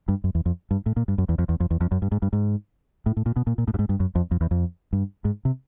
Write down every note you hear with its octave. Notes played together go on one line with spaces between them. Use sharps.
G2
F#2
E2
F2
G2
A2
A#2
G2
F#2
E2
F2
E2
F2
E2
F2
F#2
G2
G#2
G2
G#2
A2
A2
A#2
B2
A#2
A#2
A2
G2
G#2
G2
F#2
F2
F2
E2
F2
G2
G#2
C3